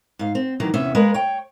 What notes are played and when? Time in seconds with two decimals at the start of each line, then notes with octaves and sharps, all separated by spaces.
0.19 G#2 F5
0.35 C4
0.60 D2 D#3 E3 F#3
0.74 E2 C3 B3 C#4 E5
0.95 G#3 A#3 A#4 B4 D#5
1.14 C#5 G5